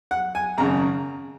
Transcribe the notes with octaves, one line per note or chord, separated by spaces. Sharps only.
F#5
G#5
G#1 F#2 C#3 A#5